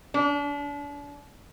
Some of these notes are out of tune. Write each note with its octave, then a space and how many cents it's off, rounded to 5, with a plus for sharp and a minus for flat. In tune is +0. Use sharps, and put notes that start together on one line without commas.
D4 -35